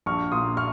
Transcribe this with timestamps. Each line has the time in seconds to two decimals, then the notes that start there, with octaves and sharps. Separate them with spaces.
0.06 A#1 C#6 F6
0.32 A#2 C6 D#6
0.57 C#6 F6